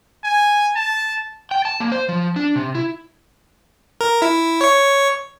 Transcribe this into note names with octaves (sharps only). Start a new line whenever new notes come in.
G#5
A5
G5
A5
A#3
C5
F3
D4
C3
E4
A#4
E4
C#5 C#6